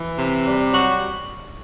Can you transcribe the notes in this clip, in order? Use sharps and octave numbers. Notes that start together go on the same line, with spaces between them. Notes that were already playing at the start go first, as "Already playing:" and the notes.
Already playing: E3
C3
G3
F#3 F#4